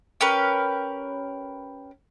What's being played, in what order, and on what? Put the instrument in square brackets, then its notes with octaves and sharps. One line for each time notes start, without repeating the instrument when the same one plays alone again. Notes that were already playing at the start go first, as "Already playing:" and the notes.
[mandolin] C#4 G4 A#4 B4